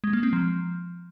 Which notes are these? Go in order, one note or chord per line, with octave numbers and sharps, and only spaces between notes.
G#3
A#3
C4
F3